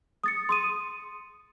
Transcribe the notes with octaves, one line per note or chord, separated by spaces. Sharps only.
D#6 A6 C#7
C6 D#6 D#7